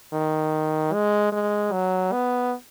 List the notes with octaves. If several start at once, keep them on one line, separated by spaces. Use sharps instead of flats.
D#3
G#3
G#3
F#3
B3